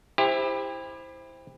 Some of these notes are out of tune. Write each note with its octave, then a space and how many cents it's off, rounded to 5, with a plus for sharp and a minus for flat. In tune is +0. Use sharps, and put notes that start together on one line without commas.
E4 -5 G4 +30 C5 +0